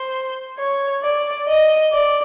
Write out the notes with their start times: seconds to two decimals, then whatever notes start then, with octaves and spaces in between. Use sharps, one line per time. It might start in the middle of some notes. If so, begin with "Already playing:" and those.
Already playing: C5
0.58 C#5
1.02 D5
1.47 D#5
1.92 D5